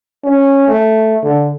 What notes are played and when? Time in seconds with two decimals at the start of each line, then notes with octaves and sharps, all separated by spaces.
0.24 C#4
0.68 A3
1.23 D3